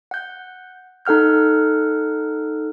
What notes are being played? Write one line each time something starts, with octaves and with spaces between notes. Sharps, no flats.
F#5 G6
D#4 A4 F#5 F6 G6